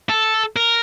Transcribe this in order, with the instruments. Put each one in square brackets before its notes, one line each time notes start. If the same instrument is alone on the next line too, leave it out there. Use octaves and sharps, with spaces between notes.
[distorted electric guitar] A4
A#4